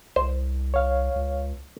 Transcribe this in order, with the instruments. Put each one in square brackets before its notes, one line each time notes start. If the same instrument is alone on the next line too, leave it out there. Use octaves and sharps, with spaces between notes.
[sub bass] C2 [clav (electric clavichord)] C5
[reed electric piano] C#5 F5
[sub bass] C#2